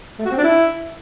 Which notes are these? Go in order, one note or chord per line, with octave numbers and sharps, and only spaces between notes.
A3
F#4
C4
D4
E4